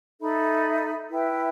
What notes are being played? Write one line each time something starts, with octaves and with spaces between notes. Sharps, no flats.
D#4 A4 E5 B5
E4 B4 E5 G5